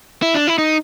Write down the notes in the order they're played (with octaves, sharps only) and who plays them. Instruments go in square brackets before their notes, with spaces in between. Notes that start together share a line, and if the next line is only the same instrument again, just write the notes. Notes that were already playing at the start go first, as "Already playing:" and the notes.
[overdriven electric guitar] E4
D4
E4
D#4